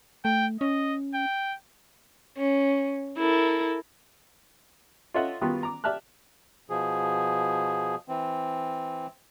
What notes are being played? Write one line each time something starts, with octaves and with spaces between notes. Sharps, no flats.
A3 G5
C#4 D#5
G5
C#4
E4 A4 A#4
F4 A4 C#5 D#5 E5 F#5
D#3 G3 B3 F4 F#4
A#5 D6
G4 D5 E5 A5 F6 F#6
B2 F3 G#4
E3 C4